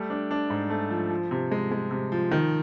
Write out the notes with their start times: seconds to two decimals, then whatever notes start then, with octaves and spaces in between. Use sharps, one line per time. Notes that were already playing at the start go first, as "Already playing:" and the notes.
Already playing: G3 A3
0.10 D4
0.31 D4
0.50 G#2
0.70 A3
0.90 F3
1.10 F3
1.31 C3
1.51 G#3
1.71 G#3
1.91 C3
2.12 F3
2.31 D#3